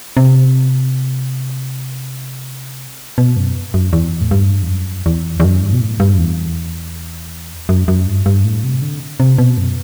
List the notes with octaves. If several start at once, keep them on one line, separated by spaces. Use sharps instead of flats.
C3
B2
F#2
F#2
E2
A2
G2
E2
F#2
E2
E2
F#2
G2
B2
A2
G2
F#2
E2
F#2
F#2
G2
G2
A2
C3
D3
C3
B2
F#2